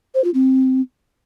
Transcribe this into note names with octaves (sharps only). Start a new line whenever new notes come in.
C5
F4
C4